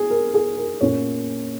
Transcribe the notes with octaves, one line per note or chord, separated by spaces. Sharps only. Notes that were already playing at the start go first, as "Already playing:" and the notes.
Already playing: G#4
A#4
G#4
A#4
A#2 A#3 C#4 C#5